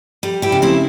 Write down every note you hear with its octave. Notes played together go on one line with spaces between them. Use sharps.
G3
E4 G4
C#3
C4 E4